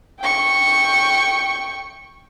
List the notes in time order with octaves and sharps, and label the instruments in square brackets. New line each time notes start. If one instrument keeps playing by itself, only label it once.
[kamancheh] G5 C#6